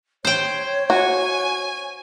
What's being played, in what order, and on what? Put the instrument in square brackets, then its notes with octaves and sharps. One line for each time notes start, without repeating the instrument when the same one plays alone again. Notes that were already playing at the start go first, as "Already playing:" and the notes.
[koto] C5 G5 [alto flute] C#5
[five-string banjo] F#4 [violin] G#5